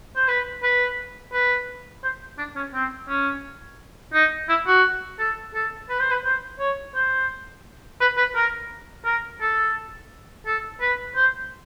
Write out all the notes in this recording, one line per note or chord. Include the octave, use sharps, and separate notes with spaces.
C5
B4
B4
B4
C5
D4
C#4
C4
C#4
D#4
E4
F#4
A4
A4
B4
C5
B4
C5
C#5
C5
B4
B4
A#4
A#4
A4
A4
B4
C5